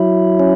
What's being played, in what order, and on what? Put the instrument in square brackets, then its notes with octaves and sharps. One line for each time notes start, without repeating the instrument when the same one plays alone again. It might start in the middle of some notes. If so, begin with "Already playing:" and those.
Already playing: [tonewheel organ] F#3 E4
C#4